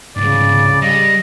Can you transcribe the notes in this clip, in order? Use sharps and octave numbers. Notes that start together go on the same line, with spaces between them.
C2 G#2 C#3 D5
G3 D#5